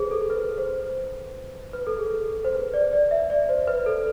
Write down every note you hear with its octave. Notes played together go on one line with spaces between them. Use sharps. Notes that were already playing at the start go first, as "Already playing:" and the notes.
Already playing: G#4 A4 B4 C5
A4
B4
C5
B4
A4
G#4
C5
B4
D5
D5
E5
D5
C5
B4
A4